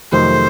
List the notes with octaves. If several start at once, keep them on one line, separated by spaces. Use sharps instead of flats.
F2 C3 D#3 F#3 A3 C5